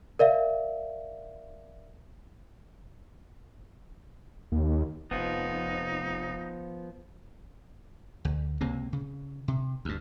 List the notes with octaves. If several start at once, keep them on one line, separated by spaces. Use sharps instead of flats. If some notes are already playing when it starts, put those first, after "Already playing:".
A#4 D5 E5 F5
D#2
F1 F3 B3 D#4
D2
C#2 C3 A#3 C4
C#3
C3
D2 G2